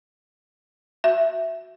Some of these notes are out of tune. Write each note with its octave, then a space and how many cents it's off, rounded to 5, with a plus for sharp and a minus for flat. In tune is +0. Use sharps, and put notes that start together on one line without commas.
F#4 +0 E5 +0